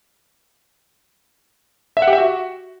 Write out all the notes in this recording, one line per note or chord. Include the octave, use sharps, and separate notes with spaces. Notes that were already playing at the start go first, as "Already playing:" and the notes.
E5
F#5
G4
E5
F#4